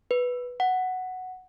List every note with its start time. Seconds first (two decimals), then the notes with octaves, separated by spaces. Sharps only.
0.11 B4
0.60 F#5